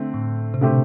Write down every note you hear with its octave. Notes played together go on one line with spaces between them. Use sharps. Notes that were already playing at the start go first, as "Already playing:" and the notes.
Already playing: D3 A3 C4
A2
C3
B2 D3 A3 C4 G4 C5